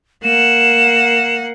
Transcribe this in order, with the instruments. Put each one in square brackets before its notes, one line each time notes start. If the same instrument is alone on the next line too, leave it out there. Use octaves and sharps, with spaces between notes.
[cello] A#3 F#5 [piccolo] E7